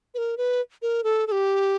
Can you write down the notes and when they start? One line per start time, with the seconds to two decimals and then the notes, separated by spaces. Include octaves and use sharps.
0.14 B4
0.18 A#4
0.37 B4
0.82 A#4
1.04 A4
1.27 A4
1.32 G4